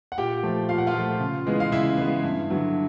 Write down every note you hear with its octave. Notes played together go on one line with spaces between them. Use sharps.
F#5
A#2 G4 G5
F3 A3
A#2 F5
F#5
F4 F5
F3 A3
C#3
E3 G#3 B3
F5
C#3 E4 E5
E3 G#3 B3
G2
D3 F#3 B3